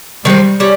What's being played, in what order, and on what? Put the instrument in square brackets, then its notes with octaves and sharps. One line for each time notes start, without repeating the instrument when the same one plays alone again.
[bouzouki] D#3 G#3 C4 [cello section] G3
[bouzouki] G3 C#4